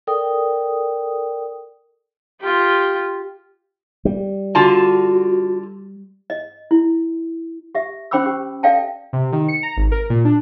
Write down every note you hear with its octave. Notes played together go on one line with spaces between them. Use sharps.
A4 A#4 D5 G5 D#6
F4 G4
G3
D3 F4 F#4 A5
D#5
E4
G4 E5
C#4 C5 G5 B5 D6 E6
G4
A4 D5 E5 F5 G5 A5
C3
D#3
C#7
A#5
G#1
A#4
A#2
D4